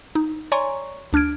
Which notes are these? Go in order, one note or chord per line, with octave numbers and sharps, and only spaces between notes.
D#4
C#5 D5 G#5 A#5 C6 C#6
D2 D4 F6 G#6 D7